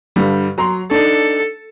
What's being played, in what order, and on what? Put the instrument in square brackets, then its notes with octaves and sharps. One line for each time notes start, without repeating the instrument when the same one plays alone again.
[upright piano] G2 D3 G3
F#3 A#5 C6
[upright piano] D4 D#4 [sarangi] A4